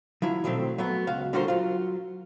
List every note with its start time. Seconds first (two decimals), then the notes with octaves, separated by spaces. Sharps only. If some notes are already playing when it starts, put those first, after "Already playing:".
0.22 F3 F#3 E4
0.44 B2 D#3 F#3 A3 C4
0.78 F#3 A3 B3
1.07 C#2 F#4 F5
1.33 D3 G3 F4 F#4 A#4 C5
1.48 F#3 F4